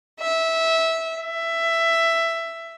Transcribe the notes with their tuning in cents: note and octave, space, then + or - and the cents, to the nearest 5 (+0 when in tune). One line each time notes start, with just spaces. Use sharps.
E5 -15
E5 +10